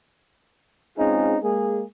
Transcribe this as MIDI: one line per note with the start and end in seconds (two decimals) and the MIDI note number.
0.98 1.37 56
0.98 1.37 60
0.98 1.37 61
0.98 1.37 63
0.98 1.37 65
0.98 1.37 68
1.43 1.83 56
1.43 1.83 58
1.43 1.83 68